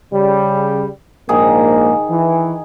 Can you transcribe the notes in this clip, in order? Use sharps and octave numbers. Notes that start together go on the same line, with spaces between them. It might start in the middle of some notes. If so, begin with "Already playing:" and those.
C#3 G3
A#1 G#2 D#3 A#3 G#4
E3